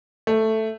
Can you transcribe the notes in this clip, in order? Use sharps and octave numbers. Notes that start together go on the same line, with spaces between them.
A3